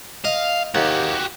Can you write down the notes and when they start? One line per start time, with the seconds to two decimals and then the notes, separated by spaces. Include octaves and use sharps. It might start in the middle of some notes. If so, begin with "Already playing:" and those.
0.25 D#5 F5
0.75 D#2 F#4 G4